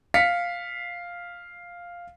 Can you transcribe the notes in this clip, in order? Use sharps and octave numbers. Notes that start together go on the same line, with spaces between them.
F5 B6 C#7